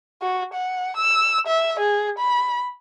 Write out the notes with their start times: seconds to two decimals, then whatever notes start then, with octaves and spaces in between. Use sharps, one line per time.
0.22 F#4
0.54 F#5
0.97 E6
1.47 E5
1.79 G#4
2.19 B5